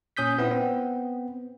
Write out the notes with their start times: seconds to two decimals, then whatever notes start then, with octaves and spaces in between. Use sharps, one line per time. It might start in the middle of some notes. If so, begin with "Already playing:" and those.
0.17 A#2 C#4 D#6 G6 B6
0.38 B3 C4 E4
0.51 B3 C4